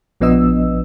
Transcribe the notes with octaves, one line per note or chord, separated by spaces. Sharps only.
A#1 F3 B3 D4 D#5 E6